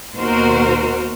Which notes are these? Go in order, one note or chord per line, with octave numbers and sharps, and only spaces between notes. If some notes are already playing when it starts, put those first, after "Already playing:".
D#2 B2 F#4 A#4 C5